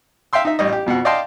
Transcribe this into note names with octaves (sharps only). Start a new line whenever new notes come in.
E5 F5 G5 C6 E6
D#4 E5
A1 G3 D#5
G4
F2 B2 C4 F#5
D5 D#5 F5 G5 A5 C6